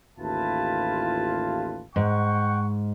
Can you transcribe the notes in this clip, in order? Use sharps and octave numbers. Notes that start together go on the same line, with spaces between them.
A1 D#2 E4 F4 B4 A5
G#2 F#5 G5 C#6